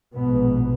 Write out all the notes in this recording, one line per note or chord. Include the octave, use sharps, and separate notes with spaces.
A#1 G#2 B2 B3